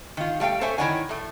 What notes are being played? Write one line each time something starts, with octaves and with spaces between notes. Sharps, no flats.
D#3 F4
G3 A3 F5 G5
A4 C5 C#5 E5 G#5
D#3 E4 C#5 D5 F#5 G#5
A2 A3